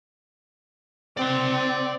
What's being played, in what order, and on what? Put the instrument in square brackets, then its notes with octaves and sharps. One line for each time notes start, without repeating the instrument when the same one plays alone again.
[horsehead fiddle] C4 [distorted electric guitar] D5 C6